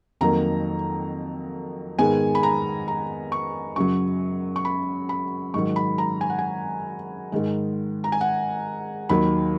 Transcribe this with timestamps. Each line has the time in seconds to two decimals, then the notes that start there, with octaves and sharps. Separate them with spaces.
0.21 F2 D#3 F#3 A#3 A#5
1.99 G#2 D#3 G#3 B3 G#5
2.35 B5
2.43 A#5
2.88 A#5
3.32 C#6
3.76 F#2 C#3 F#3 C#6
4.56 C#6
4.65 B5
5.09 B5
5.54 G#2 D#3 F#3 C#6
5.76 B5
5.98 A#5
6.21 G#5
6.30 F#5
6.39 G#5
7.32 G#2 D#3 G#3
8.04 A#5
8.12 G#5
8.21 F#5
9.09 D#2 D#3 F#3 B5